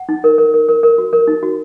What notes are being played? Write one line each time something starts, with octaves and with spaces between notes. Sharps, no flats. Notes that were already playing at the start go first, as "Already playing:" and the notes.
Already playing: F#5
D#4
A#4
A#4
A#4
A#4
A#4
F#4
A#4
D#4
F#4